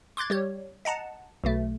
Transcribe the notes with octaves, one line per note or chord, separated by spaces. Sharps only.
C6 D6 F#6 G#6 A6
G3 G4 C#5
D#5 F#5 A5 A#5
B1 B2 A3